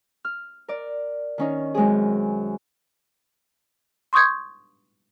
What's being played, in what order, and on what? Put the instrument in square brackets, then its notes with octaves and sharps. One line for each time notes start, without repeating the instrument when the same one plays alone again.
[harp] F6
A#4 D5
D#3 C#4 D#4
F#2 G#3 C4 G#4
[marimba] C6 C#6 D#6 G6 G#6